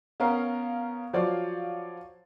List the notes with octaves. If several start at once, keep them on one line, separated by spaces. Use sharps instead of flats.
B3 C#4 A#4 F5
F3 F#3 F4 C#5 D5 F5